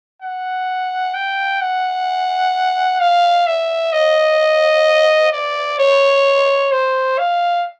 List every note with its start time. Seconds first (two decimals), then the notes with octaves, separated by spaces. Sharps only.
0.22 F#5
1.14 G5
1.61 F#5
3.00 F5
3.47 E5
3.93 D#5
5.33 D5
5.79 C#5
6.72 C5
7.19 F5